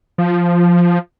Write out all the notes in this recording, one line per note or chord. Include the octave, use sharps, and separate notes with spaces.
F3